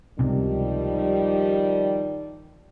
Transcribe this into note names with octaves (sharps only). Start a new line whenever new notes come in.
C#2 C3 D#3 F3 G3